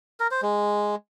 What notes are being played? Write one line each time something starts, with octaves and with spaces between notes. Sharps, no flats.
A#4
C5
G#3